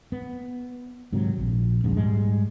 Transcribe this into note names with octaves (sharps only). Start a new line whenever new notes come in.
B3
G#2 C3 D#3 F#3
A#1
D#1 A#1 F2 G#2
G#2 G3 G#3